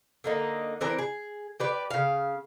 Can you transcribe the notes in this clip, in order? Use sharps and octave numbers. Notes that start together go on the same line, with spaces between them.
D3 A#3 D#4
E3 C4 D4 A#4
G#4
G4 B4 D5
C#3 F5